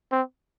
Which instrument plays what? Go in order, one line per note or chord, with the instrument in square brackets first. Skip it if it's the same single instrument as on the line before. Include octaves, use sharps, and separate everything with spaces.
[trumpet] C4